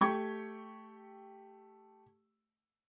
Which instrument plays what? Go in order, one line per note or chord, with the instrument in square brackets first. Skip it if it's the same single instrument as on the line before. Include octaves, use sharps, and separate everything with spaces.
[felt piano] A3 G4 G5 C#6 G#6